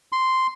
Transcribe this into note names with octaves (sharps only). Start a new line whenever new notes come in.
C6